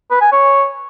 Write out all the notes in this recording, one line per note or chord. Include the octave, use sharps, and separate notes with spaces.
B4
G#5
C#5